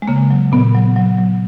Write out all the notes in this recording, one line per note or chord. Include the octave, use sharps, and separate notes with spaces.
G#3
C#3 A#3
F#3
A#2 B3
F#3
F#3
F#3